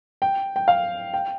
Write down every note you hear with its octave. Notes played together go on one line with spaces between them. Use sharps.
G5
G5
F5
G5